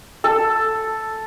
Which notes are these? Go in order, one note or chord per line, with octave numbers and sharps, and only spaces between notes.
A4